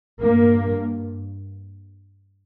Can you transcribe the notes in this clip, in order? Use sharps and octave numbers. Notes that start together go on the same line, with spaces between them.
G2 A#3